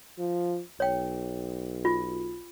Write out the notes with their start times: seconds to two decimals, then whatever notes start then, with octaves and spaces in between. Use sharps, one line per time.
0.18 F3
0.80 B1 C#5 G5
1.85 F4